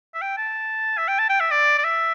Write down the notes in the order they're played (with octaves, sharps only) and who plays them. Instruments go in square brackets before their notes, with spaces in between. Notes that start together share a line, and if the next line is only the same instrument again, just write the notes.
[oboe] E5
G5
A5
E5
G5
A5
G5
E5
D5
D5
E5